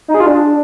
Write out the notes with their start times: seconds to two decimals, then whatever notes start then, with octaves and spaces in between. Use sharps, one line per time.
0.08 D#4
0.14 G#4
0.20 F4
0.26 D4